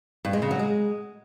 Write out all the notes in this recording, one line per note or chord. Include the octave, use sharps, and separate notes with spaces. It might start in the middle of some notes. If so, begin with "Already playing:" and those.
G2
G#3
C#3
F#3
G#3